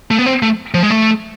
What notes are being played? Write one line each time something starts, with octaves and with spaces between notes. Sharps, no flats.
A3
B3
C4
A3
F3
G#3
A3